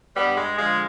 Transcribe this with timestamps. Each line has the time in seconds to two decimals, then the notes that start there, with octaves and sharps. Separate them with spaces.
0.16 G2 G3 B3
0.36 G#3
0.57 D3 F3 G#3